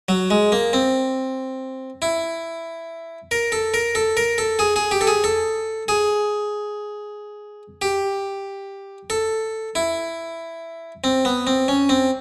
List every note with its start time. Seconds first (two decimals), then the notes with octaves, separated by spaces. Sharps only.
0.09 F#3
0.30 G#3
0.52 A#3
0.73 C4
2.02 E4
3.31 A#4
3.52 A4
3.74 A#4
3.95 A4
4.17 A#4
4.38 A4
4.59 G#4
4.76 G#4
4.91 G4
5.01 A4
5.07 G#4
5.24 A4
5.88 G#4
7.82 G4
9.10 A4
9.75 E4
11.04 C4
11.25 B3
11.47 C4
11.68 C#4
11.89 C4